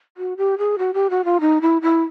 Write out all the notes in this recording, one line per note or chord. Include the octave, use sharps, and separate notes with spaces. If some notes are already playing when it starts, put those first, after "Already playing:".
F#4
G4
G#4
F#4
G4
F#4
F4
D#4
E4
E4